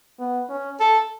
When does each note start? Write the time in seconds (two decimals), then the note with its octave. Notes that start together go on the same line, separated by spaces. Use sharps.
0.19 B3
0.49 C#4
0.80 A4